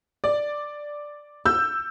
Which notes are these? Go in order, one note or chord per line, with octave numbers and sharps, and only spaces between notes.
D5
E6 G6